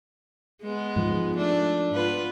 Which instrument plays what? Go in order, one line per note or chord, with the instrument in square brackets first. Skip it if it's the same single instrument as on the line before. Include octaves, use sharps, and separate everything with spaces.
[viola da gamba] G#3 B3
[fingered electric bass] G#2 F3
[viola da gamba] A3 D4
B3 F4 B4